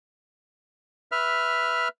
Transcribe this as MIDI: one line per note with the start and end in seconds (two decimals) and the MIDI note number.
1.12 1.88 71
1.12 1.88 76
1.12 1.88 89